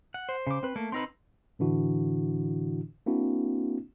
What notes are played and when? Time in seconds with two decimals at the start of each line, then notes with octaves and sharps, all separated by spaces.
0.14 F#5
0.29 C5
0.47 C#3 D6
0.63 C4 B4
0.76 A3 A#3
0.92 C4 D#4 B4 C6 E6
1.59 A2 D3 E3 D4 E4 F#4
3.06 A#3 C4 D4 E4 F#4